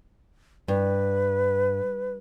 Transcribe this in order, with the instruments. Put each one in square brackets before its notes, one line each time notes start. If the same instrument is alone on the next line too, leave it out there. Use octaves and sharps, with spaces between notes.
[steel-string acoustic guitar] G2 [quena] B4